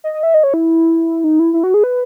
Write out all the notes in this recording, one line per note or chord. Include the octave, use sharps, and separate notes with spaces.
D#5
D#5
E5
D#5
C#5
E4
D#4
E4
E4
F#4
G#4
B4